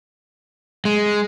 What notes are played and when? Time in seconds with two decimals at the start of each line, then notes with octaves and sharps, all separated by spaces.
0.85 G#3